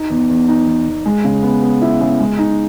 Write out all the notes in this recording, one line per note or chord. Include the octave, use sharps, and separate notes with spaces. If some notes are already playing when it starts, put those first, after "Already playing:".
Already playing: D#4
E2
E2
D#4
E2
E2
G#3
C#3
B3
B3
E4
C#3
G#3
D#4